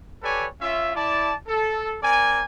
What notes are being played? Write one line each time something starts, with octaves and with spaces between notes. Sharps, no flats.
G4 A4 B4 C#5 D5 G#5
C#4 F4 E5
E4 D5 A5
A4
C4 A#4 D5 G#5